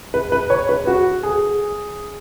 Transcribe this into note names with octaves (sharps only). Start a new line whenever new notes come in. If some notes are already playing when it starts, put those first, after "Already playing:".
B4
B4
C#5
B4
F#4
G#4